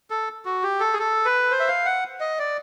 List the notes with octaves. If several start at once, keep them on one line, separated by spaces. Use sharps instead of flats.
A4
F#4
G4
A4
G#4
A4
B4
C5
E5
F5
F#5
D#5
D5